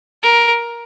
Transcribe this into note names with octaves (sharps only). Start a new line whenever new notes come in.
A#4